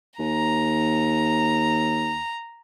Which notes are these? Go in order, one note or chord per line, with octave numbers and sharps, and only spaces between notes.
D#2 A#5